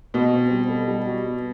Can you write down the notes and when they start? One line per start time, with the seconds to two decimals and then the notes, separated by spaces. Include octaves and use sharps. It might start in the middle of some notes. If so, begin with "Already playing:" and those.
0.14 B2 F#4
0.33 C4
0.51 G3
0.69 A4
0.88 G3
1.07 F#4
1.25 B3